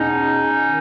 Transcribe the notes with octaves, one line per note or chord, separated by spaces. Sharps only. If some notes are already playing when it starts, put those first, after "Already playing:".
Already playing: E2 B2 C#4 D#4
D#3